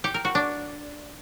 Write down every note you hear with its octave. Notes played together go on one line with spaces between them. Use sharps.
G4
A#4
F#4
D4